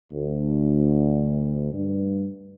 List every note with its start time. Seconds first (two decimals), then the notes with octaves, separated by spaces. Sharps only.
0.11 D2
1.72 G2